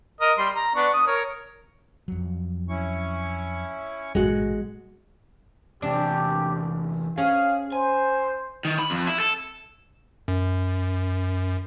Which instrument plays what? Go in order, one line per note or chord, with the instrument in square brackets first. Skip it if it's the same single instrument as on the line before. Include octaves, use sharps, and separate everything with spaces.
[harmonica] A#4 D#5
G3 C6
A#5
B3 D4 C#6
D#6
A#4 C#5
[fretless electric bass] F2 F#3
[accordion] C#4 E4 C#6
[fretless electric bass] A1 G#2 B2 [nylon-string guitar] G#3 F#4
[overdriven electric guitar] E2 C3 [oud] D4 [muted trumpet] G4
[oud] C#4 [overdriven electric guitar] G#4 [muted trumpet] F5
[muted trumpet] C5 [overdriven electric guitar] G#5
[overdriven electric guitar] D#3
B5
F2
E4
A4
[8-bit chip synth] F#2